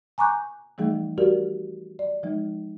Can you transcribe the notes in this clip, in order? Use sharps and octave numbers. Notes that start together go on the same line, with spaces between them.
G#5 A#5 C#6 D6 F#6 G6
E3 F3 G3 A3 D#4 G#4
G3 F#4 G4 A#4 D5
D5
F3 G#3 D#4